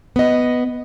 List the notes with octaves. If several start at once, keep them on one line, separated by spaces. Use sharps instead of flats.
B3 D#5